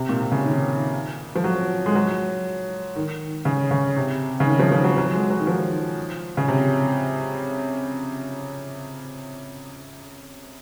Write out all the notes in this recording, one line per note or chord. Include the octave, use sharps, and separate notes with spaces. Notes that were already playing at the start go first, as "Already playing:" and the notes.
Already playing: C3
A#2
C3
C#3
D#3
F3
F#3
G#3
F#3
D#3
C#3
C#3
C3
C#3
D#3
F3
F3
F#3
F#3
G#3
F#3
D#3
F3
C#3
C3